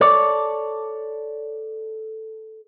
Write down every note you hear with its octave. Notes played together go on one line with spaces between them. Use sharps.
A4 C#5 D5